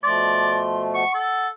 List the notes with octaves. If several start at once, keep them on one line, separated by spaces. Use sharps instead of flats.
B2 F3 A3 D5 C6
F#5 C#6
A4